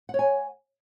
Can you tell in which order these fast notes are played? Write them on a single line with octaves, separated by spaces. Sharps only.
F#5 C#5 G#5